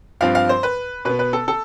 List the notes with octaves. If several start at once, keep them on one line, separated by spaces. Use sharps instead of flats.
G2 F3 C4 F5
F5
C5
B4
B2 B3 B4
B4
A4
A4